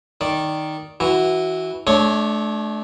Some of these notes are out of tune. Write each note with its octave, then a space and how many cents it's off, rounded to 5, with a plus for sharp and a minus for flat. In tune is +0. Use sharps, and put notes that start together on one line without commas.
D#3 +0 D5 -5
E3 -15 F#4 +5
A3 -30 D4 +0 C#5 +0